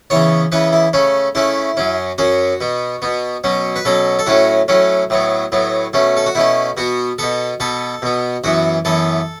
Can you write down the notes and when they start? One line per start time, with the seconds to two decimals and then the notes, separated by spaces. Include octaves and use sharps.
0.10 C#3 E3 B3 C#5
0.52 C#3 E3 B3 B4
0.73 E4
0.93 C#3 A3 C#4
1.35 C#3 A3 C#4 E4
1.77 F#2 F#3 C#4
2.18 F#2 F#3 C#4 F#4
2.61 B2 B3
3.02 B2 B3
3.44 B2 F#3 C#4
3.76 B4
3.85 B2 F#3 C#4 A4
4.19 A4
4.26 A2 F#3 A3 C#4 F#4
4.68 A2 F#3 A3 C#4
5.10 A2 F#3 B3
5.52 A2 F#3 B3
5.93 B2 A3 C#4
6.17 A4
6.26 F#4
6.35 B2 A3 C#4 E4
6.77 B2 B3 F#4
7.19 B2 B3 A4
7.60 B2 B3 A4
8.02 B2 B3
8.44 F#2 E3 B3 F#4
8.85 F#2 E3 B3 A4